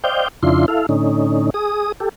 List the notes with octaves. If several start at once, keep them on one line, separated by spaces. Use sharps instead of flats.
C5 D5 D#5 F5 G5 G6
F2 C#3 D4 E4 F4 C6
E4 A4 F5
A2 D3 C#4 D#4
G#4 D#6
G4 A4